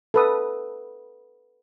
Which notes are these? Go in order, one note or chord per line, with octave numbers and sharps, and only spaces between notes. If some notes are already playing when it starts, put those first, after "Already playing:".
A4 B4 D#6